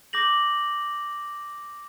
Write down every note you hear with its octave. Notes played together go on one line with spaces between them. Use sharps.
D6 G6 A#6 F#7